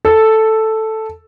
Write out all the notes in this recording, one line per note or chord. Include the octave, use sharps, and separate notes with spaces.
A4